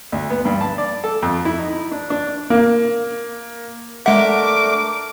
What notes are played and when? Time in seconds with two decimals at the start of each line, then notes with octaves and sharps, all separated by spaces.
0.12 D2
0.30 B3
0.45 G2
0.61 A5
0.78 D5
1.04 A4
1.22 F2
1.45 E4
1.58 D#4
1.91 D4
2.10 D4
2.50 A#3
4.06 G#3 A3 D4 A#4 E5 F#5 D6